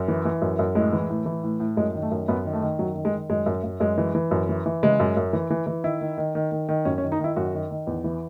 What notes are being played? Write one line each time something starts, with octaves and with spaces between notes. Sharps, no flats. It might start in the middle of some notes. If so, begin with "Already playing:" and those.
Already playing: F#2
E3
E3
F#2
F#2
A2 G#3
E3
A2
E3
A2
A2
F#2 G#3
D#3
A3
F#2
F#2 B3
D#3
A3
D#3
F#2 F#3
D#3
G#3
D#3
F#2 G#3
F#2
F#2
F#2 G#3
E3
E3
F#2
E3
E3
C#3 G#3
F#2
F#2
E3
E3
E3
D#3 E4
D#3
D#3
D#3
D#3
D#3
F#2 C#4
C#4
D#3
D#4
D#3 E4
F#2 F#4
D#3
D#3
E2
E3